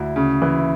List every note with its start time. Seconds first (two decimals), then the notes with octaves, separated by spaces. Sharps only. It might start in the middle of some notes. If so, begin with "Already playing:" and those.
Already playing: D2 E4
0.16 C#3
0.42 E3